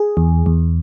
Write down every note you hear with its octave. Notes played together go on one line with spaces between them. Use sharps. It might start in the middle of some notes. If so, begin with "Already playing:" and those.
Already playing: G#4
E2
E2